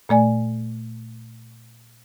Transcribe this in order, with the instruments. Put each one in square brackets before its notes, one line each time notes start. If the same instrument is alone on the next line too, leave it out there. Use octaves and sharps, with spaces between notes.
[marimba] A#2 A3 D5 G#5